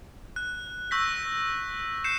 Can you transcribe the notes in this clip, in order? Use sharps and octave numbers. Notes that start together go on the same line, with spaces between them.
F#6
C#6 E6 G6 A#6 B6
G6 C7 C#7 E7